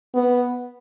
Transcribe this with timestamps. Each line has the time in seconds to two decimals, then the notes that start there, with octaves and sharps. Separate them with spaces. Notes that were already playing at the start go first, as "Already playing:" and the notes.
0.14 B3